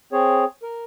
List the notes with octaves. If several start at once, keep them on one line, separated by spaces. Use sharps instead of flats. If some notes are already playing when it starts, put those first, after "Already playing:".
C4 G#4 C#5
A#4